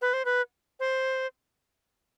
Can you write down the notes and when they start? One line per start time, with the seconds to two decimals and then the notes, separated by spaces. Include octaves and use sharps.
0.02 B4
0.13 C5
0.25 B4
0.80 C5